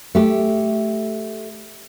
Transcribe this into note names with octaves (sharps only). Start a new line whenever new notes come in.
A3 G4